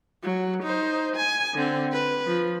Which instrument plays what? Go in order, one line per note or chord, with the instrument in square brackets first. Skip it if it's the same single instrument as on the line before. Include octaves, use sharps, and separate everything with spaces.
[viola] F#3
D#4 C5
G#5
D3 C4
B4
F3